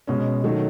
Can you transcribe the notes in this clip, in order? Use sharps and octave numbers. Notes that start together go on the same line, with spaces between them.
B2 G#3 C#4
D#3 F#3 A3